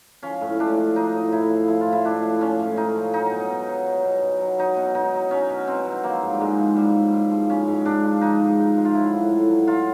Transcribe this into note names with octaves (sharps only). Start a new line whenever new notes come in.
F3 C#4
A2
A2 D4
F3
F3 D#4
A2
A2 E4
F3
F3 E4
F4
A2
E4
A2 D4
F3
F3 C#4
A2
A2 D#4
F3
F#3 D#4
B2
B2
F#3
F#3
B2
B2
F#3
F#3 D#4
B2
B2 D#4
F#3
F#3 C#4
B2
B2 C4
F#3
F3 A#3
G#2
G3
G#2 G#3
F3
F3 G3
G#2
G#2
F3
F3 C#4
G#2
G#2 D4
F3
F3 D#4
G#2
G#2
F3
F4
F#3 E4
A2
A2
F#3
F#3 F4